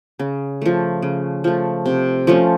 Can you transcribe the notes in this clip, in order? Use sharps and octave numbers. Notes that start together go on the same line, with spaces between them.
C#3
F3 A3
C#3
F3 A3
C3
F3 A3 C#4